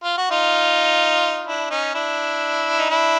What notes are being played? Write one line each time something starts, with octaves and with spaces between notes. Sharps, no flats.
F4
F#4
D#4 F4
D4 E4
C#4 D#4
D4 E4
D#4
D4 E4